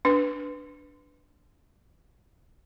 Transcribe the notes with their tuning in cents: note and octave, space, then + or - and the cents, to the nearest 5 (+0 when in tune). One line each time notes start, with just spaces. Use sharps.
D4 +0 B4 +0